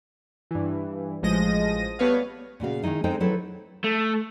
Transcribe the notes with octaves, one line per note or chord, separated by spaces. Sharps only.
G2 E3
A1 F3 G#3 D#5 A#6 D#7
G3 A3 B3 B4 C#5 F5
A#2 C#3 F#4 F5
D#3 G#3 A3 D#4 E4
G#3 C4 D#4 A4 C5 G5
F#3 E4 A4 B4 C5
A3